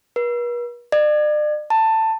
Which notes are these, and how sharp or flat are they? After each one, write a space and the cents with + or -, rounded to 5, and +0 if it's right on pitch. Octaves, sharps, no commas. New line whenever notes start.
B4 -45
D5 +40
A5 +15